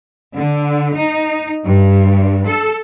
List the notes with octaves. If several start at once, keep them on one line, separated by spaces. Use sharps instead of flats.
D3
D#4
G2
A4